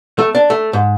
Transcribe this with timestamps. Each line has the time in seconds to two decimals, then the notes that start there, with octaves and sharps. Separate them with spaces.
0.19 A3
0.35 D4
0.50 A3
0.73 G#2